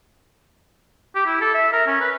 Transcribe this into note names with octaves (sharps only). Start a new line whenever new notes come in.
G4
E4
A4
E5
A#4
C#4
B4